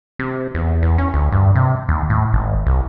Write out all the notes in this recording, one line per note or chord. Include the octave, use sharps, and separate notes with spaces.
C3
E2
E2
C#4
D2
G2
C3
D#2
A2
G#1
C2